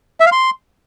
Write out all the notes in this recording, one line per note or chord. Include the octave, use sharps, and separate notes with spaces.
E5
F5
C6